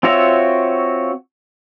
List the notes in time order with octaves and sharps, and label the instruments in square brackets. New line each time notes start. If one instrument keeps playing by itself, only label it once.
[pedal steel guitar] C4 F4 F#4 C#5 E5